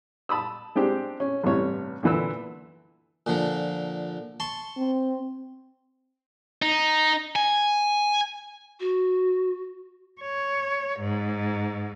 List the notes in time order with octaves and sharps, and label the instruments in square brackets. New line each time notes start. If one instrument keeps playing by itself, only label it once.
[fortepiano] A5 B5 D#6 E6
G#3 C4 D4 G4
C#4
A1 G2 C3 C#5
A#2 D3 E3 B4 E6
[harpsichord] A#2 D3 F3
A5 C6 C#6
[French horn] C4
[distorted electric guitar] D#4
G#5
[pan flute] F#4
[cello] C#5
G#2